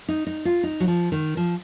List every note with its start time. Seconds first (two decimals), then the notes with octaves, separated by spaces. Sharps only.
0.08 D#4
0.27 D#4
0.45 F4
0.63 D#4
0.80 F#3
0.88 F3
1.12 D#3
1.37 F3